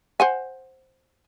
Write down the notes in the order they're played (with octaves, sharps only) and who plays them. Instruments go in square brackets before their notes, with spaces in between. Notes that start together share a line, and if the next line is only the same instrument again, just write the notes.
[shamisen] C5 F#5 G#5